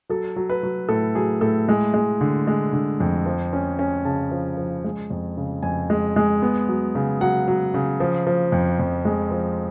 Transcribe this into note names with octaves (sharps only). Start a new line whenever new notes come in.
F#3 A4
F#3
B4
F#3
A2 A4
F#3 G#4
A2 A4
G#3
G#3
D3
G#3
D3
F2
F3
C#4
C#4
C#3 A5
F3
F3
G#3
F2
C#3
F2 G#5
G#3
G#3
B3
F#3
C#3
F#3 F#5
F#3
C#3
F3
F3
F2
F2
G#3
F3